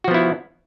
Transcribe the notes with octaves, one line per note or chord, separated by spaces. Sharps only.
F3 B3 E4 F#4